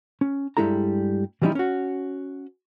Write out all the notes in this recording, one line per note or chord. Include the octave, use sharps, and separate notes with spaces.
C#4
G2 G3 G#3 E4 A4 A#5
E3 F3 G3 C#4 D#4 E4
C#4 F#4